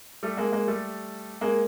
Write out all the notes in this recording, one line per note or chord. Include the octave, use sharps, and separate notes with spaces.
G3 A3
G#3 A#3
G#3 A#3
G3 A3
G#3 A#3